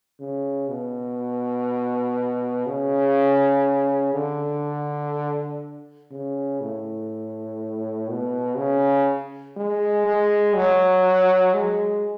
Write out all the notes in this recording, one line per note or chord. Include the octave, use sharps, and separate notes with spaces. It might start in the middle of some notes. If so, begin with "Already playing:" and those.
C#3
B2
C#3
D3
C#3
A2
B2
C#3
G#3
G#3
F#3
G#3